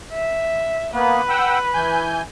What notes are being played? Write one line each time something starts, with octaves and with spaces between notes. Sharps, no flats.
E5
A#3 B3 B4
F#5 G5 E6
E3 G#5 G6